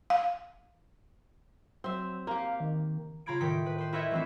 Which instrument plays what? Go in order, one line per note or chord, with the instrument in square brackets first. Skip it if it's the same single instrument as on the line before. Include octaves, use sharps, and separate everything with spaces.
[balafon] F5
[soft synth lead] F#3 [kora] C4 E5
[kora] A#3 G4 [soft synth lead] F5
[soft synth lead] D#3
[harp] C#3 F4 A#5 B5 G#6 D7
A2 D#3 G5 B6
B4
B4 C5
E4 A#4 B4 C#5 D#5 E5
E3 A3 C4 D4 E4